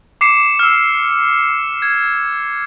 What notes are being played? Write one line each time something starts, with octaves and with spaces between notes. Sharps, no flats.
D6 C7 C#7 E7
E6 F6
G#6